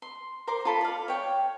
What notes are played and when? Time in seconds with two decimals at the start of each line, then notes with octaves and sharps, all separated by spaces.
0.02 C6
0.47 A#4 C5 C6 D6
0.65 F4 A4 B5
0.81 D5 F5
1.08 C#5 G5